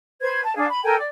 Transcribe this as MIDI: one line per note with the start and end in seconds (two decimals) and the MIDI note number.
0.21 0.40 71
0.21 0.40 72
0.21 0.40 92
0.43 0.55 81
0.56 0.65 62
0.56 0.65 68
0.56 0.65 77
0.69 0.83 83
0.83 0.95 69
0.83 0.95 70
0.83 0.95 79
0.83 0.95 80
0.97 1.07 74